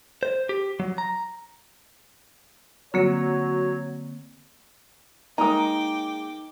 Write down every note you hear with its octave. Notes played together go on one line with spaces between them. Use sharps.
C5
G4
F#3
A#5
D3 F#3 A#3 C4 C#5
G#3 A#3 D#4 G5 A#5 D6 D#6